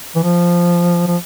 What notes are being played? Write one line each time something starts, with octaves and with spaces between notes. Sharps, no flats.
E3
F3
F3